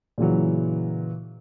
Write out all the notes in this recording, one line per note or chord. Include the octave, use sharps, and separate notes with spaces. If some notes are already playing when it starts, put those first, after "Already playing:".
A#2 C#3 E3 F#3